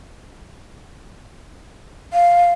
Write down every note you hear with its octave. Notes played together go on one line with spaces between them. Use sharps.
F5